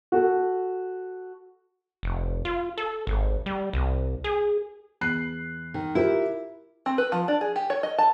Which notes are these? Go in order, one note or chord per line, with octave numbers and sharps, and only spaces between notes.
F#4 A4
F1
F4
A4
G#1
G3
C2
G#4
E2 F#6 C7
D#3
E4 F4 G4 A#4
C4
B4
F3
D4
G#4
G4
C#5
D#5
A5